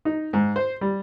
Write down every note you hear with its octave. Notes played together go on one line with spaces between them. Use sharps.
D#4
G#2
C5
G3